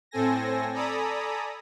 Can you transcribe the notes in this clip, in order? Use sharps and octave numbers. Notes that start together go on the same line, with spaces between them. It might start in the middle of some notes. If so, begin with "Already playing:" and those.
A2 C4 A4 G#5 A#6
A4 D5 G#5 A#5 B5 D#6